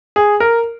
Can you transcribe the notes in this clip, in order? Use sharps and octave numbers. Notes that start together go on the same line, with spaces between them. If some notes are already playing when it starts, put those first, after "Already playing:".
G#4
A#4